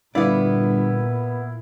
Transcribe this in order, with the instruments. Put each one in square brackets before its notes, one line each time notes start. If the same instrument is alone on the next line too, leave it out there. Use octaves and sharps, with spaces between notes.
[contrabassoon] G1 [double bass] A#2 [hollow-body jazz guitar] B3 D5 [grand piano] E4 F5